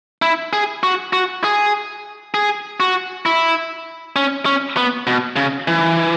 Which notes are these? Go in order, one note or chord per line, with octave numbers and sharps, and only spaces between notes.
E4
G#4
F#4
F#4
G#4
G#4
F#4
E4
C#4
C#4
B3
B2
C#3
E3